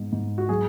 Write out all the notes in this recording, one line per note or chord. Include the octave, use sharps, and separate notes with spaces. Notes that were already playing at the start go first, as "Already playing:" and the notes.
Already playing: G#2 B3
G#2
F#4
F#3 G#4